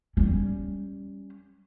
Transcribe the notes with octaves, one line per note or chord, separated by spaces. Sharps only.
G3 C#4